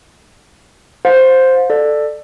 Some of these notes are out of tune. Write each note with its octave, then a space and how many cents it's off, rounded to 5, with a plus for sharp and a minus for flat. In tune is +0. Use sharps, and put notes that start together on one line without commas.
C5 +0 F5 +40
A4 +0 D5 +25